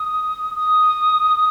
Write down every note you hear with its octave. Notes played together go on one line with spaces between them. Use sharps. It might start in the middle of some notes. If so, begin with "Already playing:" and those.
Already playing: D#6
D#6